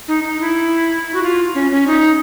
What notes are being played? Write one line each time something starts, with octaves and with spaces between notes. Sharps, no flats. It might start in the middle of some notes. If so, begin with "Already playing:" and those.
D#4
D#4
E4
F#4
F4
C#4
C#4
D#4